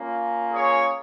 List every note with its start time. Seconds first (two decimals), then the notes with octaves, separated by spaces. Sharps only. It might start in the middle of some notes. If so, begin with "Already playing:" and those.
Already playing: A#3 C#4 F4
0.53 G#4 C#5